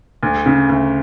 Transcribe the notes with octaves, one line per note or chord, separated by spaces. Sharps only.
D2
C#3
D2